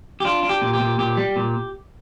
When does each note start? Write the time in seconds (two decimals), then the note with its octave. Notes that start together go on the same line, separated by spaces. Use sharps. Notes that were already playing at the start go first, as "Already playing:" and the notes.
0.20 G4
0.25 D4 F4
0.43 D4
0.49 G4
0.62 A#2
0.73 G4
0.80 A#2
0.98 A#2 G4
1.17 G3
1.36 A#2